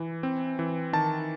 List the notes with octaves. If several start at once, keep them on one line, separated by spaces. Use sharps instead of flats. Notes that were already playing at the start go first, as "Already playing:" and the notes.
Already playing: E3
C4
E3
D#3 A5